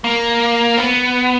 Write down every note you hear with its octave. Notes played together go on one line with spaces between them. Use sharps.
A#3
B3